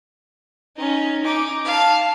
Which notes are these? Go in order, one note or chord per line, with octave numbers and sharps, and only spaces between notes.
C#4 D#4
D#4 D6
F5 A5